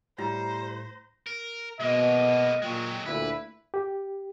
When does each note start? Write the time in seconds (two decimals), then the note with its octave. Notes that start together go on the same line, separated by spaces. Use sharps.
0.18 A2 G3 C5 A#5
1.26 A#4
1.80 B2 G#3 A#3 D#5
2.62 A#2 F#3 G#3 G5
3.06 D2 A#2 E4 B4
3.74 G4